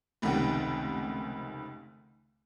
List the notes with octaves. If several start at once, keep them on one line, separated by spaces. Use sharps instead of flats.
F1 C#2 C3 D#3 F#5 G5